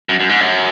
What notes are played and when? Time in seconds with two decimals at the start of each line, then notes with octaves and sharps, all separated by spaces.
0.09 F#2
0.20 F#2
0.29 G#2
0.41 F#2